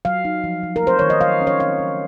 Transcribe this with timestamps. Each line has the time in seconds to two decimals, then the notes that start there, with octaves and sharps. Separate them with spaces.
0.05 F#3 F5
0.25 D#4
0.44 F3
0.63 F3
0.76 A#4
0.83 A3 C5
0.99 D#3 C#5
1.10 D#5
1.21 F#3 F5
1.41 C#4
1.47 C#5
1.59 C4 F5
1.79 F#3